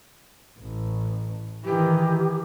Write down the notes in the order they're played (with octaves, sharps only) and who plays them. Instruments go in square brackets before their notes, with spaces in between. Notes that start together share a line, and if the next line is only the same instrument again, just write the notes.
[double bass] A1
[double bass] D#3 E3 [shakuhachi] G4